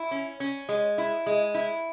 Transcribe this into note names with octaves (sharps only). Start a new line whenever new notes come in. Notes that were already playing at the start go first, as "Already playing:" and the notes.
Already playing: E4
C#4
C#4
G#3
E4
G#3
E4